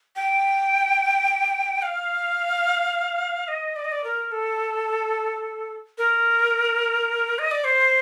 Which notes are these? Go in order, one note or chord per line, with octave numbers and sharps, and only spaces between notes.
G5
F5
D#5
D5
D#5
D5
A#4
A4
A#4
D#5
D5
C5